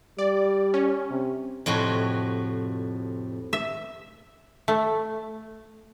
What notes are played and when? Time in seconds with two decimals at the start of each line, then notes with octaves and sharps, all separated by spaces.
0.18 G3 D5
0.74 C#4
1.11 C3
1.66 F2 A2 C3 F#4
3.53 E5
4.68 A3